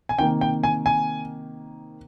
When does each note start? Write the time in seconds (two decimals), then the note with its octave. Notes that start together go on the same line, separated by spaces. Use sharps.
0.09 G#5
0.19 C3 D#3 A#3 G5
0.41 G5
0.64 G#5
0.86 G#5